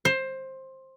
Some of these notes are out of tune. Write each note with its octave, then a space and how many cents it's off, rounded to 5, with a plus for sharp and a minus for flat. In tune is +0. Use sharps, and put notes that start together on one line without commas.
C5 +15